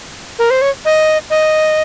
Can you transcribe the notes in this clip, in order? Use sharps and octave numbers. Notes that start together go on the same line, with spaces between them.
A#4
C5
C#5
D#5
D#5